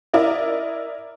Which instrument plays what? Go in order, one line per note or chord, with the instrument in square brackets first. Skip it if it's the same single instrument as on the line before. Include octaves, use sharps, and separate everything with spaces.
[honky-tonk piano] E4 A#4 D5 D#5